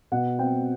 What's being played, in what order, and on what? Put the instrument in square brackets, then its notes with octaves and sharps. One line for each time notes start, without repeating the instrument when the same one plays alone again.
[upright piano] B2 F#5
C4 G5